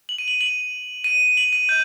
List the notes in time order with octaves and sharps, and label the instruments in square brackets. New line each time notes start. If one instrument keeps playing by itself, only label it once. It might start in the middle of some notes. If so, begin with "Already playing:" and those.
[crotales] F#7
D#7
F#7
F#7
D#7
F#7
D#7
G6